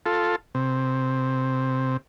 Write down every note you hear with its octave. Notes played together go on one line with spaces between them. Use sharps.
F4 A4
C3